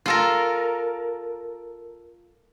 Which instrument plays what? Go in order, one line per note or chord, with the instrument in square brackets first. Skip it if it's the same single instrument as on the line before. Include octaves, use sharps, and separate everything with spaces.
[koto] F4 A4 A#4